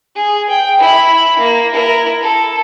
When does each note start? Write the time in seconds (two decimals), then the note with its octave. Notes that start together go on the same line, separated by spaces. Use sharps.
0.15 G#4
0.49 G5
0.79 E4 B5
1.39 A#3
1.74 E4 A#4
2.23 A4